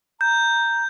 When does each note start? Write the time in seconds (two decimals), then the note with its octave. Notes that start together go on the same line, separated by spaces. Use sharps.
0.21 A#5 G6